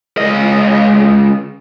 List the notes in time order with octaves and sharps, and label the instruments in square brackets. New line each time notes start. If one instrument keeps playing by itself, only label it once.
[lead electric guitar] C#2 D#5